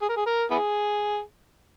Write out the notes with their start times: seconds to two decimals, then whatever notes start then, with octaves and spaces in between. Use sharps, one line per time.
0.02 G#4
0.09 A#4
0.16 G#4
0.26 A#4
0.50 B3 E4 G#4